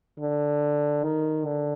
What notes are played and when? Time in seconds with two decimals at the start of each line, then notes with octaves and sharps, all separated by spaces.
0.20 D3
1.04 D#3
1.45 D3